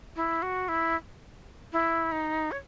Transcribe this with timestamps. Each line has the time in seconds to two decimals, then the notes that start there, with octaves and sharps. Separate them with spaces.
0.16 E4
0.42 F#4
0.69 E4
1.73 E4
2.12 D#4
2.52 C#5